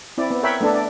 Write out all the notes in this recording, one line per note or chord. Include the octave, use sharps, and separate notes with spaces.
C4 E4 D5
B3
A#4 C#5 E5 F#5 G5 B5
A3 B3 D4 A4
D5